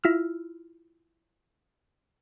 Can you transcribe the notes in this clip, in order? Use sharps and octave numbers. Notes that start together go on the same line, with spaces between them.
E4 F4 E6 F6